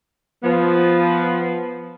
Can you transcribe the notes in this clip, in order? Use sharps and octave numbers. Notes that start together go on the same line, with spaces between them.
F3 B3